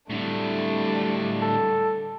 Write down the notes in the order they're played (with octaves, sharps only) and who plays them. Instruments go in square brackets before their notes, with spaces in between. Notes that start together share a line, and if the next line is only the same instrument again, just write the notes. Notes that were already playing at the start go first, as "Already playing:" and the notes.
[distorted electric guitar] A2 D3 [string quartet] G3 A3 D4
[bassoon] A4